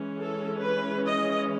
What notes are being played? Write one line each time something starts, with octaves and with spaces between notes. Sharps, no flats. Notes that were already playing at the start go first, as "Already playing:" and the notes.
Already playing: E3 G#3 C#4
A4
B4
D#5